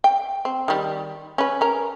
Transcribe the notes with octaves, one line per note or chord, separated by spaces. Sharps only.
G5
C4
D#3 G3
C#4 B4
C#4 A#4